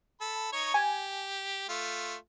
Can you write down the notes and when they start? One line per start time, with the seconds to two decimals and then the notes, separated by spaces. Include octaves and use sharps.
0.21 A4 B5
0.53 D#4 C#5 C#6
0.74 G4 G#5
1.69 A3 F4